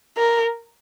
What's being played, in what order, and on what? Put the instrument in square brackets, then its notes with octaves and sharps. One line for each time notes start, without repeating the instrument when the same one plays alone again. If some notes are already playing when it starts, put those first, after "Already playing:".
[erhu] A#4